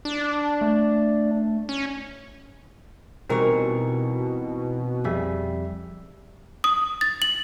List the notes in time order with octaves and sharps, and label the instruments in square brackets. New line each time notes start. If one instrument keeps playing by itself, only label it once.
[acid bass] D4
[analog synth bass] A3
[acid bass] C#4
[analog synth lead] B2 [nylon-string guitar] E3 G3 A#4 [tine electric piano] C4 D#4 C#6
[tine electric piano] F2 G3 E5 [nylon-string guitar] G#4
[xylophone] D#6
A6
F#7